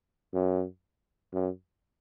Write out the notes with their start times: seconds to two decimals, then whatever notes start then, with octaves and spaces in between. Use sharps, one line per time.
0.33 F#2
1.33 F#2